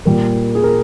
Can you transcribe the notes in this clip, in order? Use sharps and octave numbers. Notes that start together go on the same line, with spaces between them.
A#2 G3 A#3 A#4
G#4
A#4